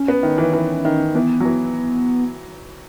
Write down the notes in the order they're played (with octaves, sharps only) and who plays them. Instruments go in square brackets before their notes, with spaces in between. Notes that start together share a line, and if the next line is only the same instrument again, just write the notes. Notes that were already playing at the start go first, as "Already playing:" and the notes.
Already playing: [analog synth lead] C#4
[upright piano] B3
D#3
E3
E3
D#3
[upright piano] E3 [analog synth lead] B3
[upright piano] F#3
E3